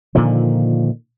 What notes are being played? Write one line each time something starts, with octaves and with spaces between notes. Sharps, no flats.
A#2 D3 D#3 F3